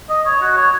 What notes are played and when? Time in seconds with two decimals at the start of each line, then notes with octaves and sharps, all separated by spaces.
0.10 D#5
0.26 C#5
0.42 F#4
0.57 C#5